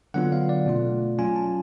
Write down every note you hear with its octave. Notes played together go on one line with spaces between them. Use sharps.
D3 F#3 B3 D4 F4 F#5
F5
D5
B2 A3 F4
F#3 C#4 F4 G#5
A5